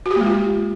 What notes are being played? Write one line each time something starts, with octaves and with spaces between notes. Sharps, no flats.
F#4
G4
A#3
G#3
F4